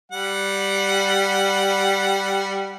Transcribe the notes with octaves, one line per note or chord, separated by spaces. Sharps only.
G3 F#5